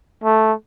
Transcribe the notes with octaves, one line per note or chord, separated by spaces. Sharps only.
A3